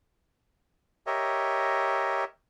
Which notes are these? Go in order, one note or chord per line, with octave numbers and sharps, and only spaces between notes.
G4 A#4 C#5 D#5 E5